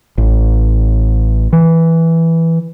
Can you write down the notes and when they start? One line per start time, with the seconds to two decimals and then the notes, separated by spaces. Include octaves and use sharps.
0.18 A1
1.53 E3